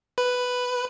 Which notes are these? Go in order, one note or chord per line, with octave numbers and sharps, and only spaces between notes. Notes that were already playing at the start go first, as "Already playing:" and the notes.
B4